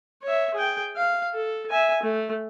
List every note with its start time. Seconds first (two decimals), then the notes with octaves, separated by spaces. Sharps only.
0.23 C#5 E5
0.54 G#4 G5
0.96 F5
1.34 A4
1.70 E5 G#5
2.03 A3